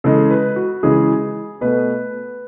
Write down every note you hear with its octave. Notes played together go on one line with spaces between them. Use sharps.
C#3 E3 G#3 A4
B4
F#4
C#3 E3 G#3 G#4
B2 A3 B4